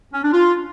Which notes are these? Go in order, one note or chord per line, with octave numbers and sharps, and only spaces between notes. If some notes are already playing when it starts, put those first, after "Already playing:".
C#4
D4
F4